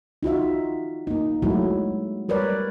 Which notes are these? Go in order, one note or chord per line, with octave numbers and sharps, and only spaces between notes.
D#4 F4 F#4 E5
A#3 D#4
F#3 G#3 A3 E4 F#4
G3 A#4 B4 C#5 D5